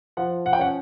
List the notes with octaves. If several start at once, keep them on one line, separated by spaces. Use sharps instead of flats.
F3 F#5
F#5
G5
C#4 F#5